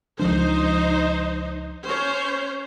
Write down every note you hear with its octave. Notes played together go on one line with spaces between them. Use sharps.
C#2 F3 D4 D#4 C5
C#4 C5 C#5